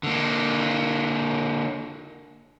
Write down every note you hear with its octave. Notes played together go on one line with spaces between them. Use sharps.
D3 A#3